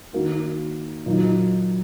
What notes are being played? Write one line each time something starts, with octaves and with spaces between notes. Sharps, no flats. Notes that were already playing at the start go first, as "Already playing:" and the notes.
D#3 A#3 F#4
A#2 F#3 D#4